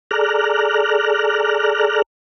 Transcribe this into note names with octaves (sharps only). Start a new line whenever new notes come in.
G#4 A4 D5 A#5 F6 F#6